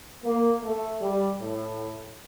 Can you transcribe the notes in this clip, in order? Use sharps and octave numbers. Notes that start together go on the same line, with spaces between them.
A#3
A3
G3
A2